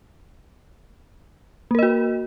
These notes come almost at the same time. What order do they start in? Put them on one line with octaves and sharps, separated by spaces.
A#3 A#4 D#5 F#4